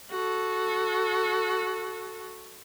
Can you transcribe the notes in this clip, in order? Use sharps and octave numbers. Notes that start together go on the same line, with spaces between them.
F#4 A4